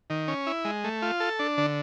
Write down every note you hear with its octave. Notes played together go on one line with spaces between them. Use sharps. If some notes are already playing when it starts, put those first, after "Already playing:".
D#3
C#4
E4
G#3
A3
F4
A4
D4
D3